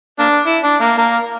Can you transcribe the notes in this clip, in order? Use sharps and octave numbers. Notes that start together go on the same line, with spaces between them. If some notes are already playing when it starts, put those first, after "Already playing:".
A#3 D4
E4
D4
A#3
A#3